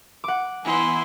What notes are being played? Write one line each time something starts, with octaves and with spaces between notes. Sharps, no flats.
F#5 D6
E3 B3 E4 G#5 C6